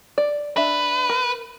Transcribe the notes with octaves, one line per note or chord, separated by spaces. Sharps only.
D5
D4 B4 E5
A#4